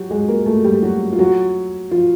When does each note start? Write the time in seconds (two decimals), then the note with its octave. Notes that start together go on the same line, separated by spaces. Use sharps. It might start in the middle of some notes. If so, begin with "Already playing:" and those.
Already playing: F#3 F#4 G4
0.10 G#3 G#4
0.28 A#3 A#4
0.46 A3 A4
0.64 G3 G4
0.82 F#3 F#4
1.13 F4
1.19 F#3 F#4
1.91 F3 F4